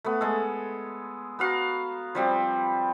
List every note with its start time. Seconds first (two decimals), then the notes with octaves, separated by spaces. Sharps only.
0.04 A3 B3
0.21 G#3 A4
1.39 B3 F#4 F5 A#5
2.15 F3 G3 C4